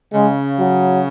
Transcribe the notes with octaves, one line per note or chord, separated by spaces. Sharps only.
C#3 G#3
F#3